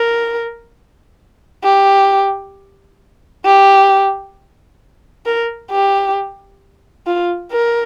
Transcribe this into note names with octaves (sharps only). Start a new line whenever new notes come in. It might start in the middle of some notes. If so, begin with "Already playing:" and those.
Already playing: A#4
G4
G4
A#4
G4
F4
A#4